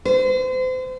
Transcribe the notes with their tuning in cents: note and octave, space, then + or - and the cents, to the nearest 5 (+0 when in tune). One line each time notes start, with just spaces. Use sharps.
C5 -35